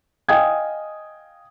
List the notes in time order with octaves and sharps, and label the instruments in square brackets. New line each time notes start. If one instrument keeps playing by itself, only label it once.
[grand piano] D#5 F5 G5 G#5 D#6 G#6